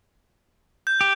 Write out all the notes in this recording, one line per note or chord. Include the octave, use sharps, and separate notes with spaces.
G6
G4